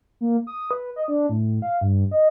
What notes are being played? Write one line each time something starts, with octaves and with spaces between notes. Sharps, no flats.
A#3
D#6
B4
D#5
D4
A2
F5
G2
D#5